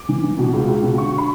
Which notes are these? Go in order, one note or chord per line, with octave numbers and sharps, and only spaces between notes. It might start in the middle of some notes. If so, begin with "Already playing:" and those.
Already playing: D6
E3
E3
B2
C#2
C#2
B2
D3 C#6
B5